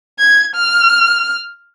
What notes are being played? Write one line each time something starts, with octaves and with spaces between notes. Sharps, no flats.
G#6
F6